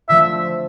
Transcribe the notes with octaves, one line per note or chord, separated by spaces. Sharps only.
D3 F3 A3 C4 E5